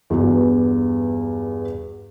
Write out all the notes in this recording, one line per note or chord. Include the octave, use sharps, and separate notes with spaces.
E2 G2 B3 F#4